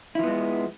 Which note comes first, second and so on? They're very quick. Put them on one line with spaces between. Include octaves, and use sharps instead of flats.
E4 F3 B3 G#3